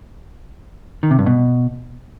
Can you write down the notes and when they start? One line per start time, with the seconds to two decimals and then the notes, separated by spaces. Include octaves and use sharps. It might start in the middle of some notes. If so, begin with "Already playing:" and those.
1.03 D#3
1.11 C3
1.19 G2
1.26 B2